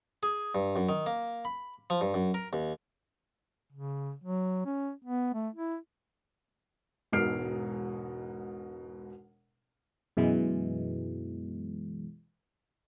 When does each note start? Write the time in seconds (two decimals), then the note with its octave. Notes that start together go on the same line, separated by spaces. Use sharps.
0.23 G#4
0.55 G2
0.76 F#2
0.89 D#3
1.06 A#3
1.45 B5
1.90 F3
2.01 G2
2.14 F#2
2.34 A#4
2.53 D#2
3.72 C#3
4.24 F#3
4.65 C#4
5.04 B3
5.34 A3
5.55 E4
7.12 E1 G#2 B2 F6 C7 D7
10.17 F#2 B2 E3 G#3